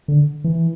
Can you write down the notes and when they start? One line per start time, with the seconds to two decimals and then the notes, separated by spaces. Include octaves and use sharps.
0.08 D3
0.44 E3